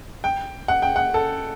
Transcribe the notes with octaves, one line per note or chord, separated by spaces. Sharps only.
G5
F#5
G5
F#5
A4